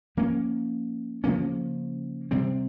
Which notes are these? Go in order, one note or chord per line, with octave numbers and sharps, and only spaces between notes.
F3 A#3 C#4
C#3 F3 A#3 C#4
C3 G3 C4